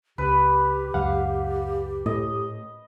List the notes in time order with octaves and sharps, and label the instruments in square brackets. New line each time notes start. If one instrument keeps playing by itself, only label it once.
[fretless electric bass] C#2 [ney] G4 [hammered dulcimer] B4
[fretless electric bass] C#2 F#2 [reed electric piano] F5 F#5
[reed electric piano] A2 [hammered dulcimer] D#5